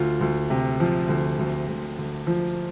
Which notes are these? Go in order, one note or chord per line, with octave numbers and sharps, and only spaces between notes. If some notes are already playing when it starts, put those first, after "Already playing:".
Already playing: D2 F4
D2
C3
F3
D2
D2
D2
D2
F3